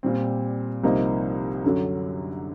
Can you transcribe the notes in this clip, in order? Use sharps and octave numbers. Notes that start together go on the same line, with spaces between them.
A#2 G3 C4
C2 C3 F3 A#3 D#4
F#2 D3 F#3